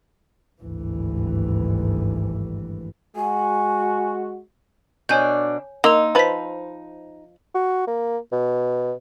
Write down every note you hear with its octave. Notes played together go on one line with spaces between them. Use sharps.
G#1 D2 G2 E3
G#3 F#4 G#5
B2 D4 C#5 G#5 G6
A#3 D#4 C6 E6 F7
F3 B4 C5 B6
F#4
A#3
B2